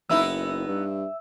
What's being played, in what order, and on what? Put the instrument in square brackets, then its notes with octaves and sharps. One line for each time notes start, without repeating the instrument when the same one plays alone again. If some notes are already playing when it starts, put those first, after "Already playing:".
[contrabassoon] F#1 [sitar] B3 D#4 E4 [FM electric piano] E5 E6
[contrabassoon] G2